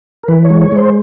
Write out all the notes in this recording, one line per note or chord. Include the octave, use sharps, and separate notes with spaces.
A#4
E3 B4
C#5
G#3
C#5
G#3
C5